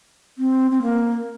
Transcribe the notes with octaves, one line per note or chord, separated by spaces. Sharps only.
C4
C4
A#3